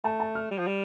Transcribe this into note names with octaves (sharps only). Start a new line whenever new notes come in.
A3 A5
A5
F6
G3
F3
G3